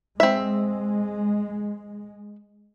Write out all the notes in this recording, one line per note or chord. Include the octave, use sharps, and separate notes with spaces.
G#3 C4 E5